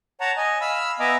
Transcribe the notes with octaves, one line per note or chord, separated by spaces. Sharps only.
C#5 F#5 A5 A#5
D#5 G#5
F5 B5 E6
B3 D#5 E5 G#5 A#5 D6